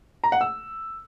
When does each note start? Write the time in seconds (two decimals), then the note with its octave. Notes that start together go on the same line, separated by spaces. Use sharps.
0.24 A#5
0.32 F#5
0.41 E6